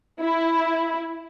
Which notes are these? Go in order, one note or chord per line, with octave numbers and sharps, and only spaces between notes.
E4